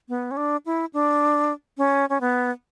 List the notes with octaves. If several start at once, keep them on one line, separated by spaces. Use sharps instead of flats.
B3
C#4
D4
E4
D4
C#4
C#4
B3